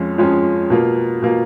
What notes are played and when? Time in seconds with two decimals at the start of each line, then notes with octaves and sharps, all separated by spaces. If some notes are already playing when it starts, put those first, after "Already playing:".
Already playing: F2 F3 G#3 C#4
0.18 F2 F3 G#3 C#4
0.70 B2 A#3 F4
1.22 B2 A#3 F4